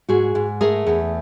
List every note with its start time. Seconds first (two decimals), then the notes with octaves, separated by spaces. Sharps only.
0.09 G#2 F#4 G#4
0.35 G#2
0.61 A3 G#4 A#4
0.87 E2